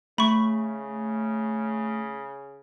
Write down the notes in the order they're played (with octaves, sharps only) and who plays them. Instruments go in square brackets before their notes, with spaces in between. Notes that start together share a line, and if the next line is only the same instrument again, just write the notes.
[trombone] C#3 [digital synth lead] A3 [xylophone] B5 C#6